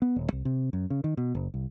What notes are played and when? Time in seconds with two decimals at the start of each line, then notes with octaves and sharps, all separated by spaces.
0.02 B3
0.16 D#1
0.32 C2
0.45 C3
0.73 F#2
0.90 C#3
1.04 D#3
1.17 B2
1.35 F#1
1.54 C2